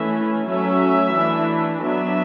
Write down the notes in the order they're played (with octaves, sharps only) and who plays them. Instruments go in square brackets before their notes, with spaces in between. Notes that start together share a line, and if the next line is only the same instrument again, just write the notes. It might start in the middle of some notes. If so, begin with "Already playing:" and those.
Already playing: [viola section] E3 A3 C#4 E5
F#3 A3 C#4 E5
E3 A3 D4
F#3 B3 D4 E5